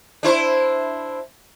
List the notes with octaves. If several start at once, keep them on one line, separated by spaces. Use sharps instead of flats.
D4 E4 C5